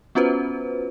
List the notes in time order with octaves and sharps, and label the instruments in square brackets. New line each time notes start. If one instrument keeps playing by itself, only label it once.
[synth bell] B3 C#4 F4 F#4 B4 C5